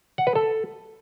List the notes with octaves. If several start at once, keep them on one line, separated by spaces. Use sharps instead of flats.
F#5
B4
A4